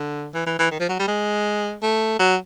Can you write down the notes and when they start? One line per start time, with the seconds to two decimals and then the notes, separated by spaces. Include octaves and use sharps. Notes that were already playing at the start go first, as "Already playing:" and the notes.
Already playing: D3
0.34 E3
0.46 E3
0.59 E3
0.71 D#3
0.80 F3
0.89 F#3
0.99 G3
1.08 G#3
1.82 A3
2.19 F#3